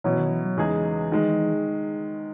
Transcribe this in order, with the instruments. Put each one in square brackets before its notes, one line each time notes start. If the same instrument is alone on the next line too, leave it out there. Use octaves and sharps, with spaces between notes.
[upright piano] B2 F#3 C#4 E4 [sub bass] E3
[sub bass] D#3
E3
F#3
[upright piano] E2 C#3 G#3 D#4 G#4 [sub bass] E3
[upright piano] D#3 G#3